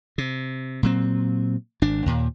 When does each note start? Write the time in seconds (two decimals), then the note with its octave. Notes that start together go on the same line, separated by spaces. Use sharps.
0.18 C3
0.83 A#2 F#3 C4
1.82 G#1 D4
2.06 D#2 A#2